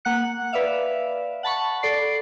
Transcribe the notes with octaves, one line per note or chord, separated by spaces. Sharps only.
A#3 F#5 F#6 C#7
B4 D5 E5 F5
F#5 A5 B5 C#6
A4 D5 C7